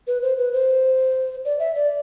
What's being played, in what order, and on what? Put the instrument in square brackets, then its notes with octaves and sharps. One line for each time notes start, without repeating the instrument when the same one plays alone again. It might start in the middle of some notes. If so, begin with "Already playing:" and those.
[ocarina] B4
C5
B4
C5
D5
E5
D5